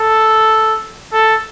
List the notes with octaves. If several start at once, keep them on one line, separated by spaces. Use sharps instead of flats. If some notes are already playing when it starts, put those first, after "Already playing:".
Already playing: A4
A4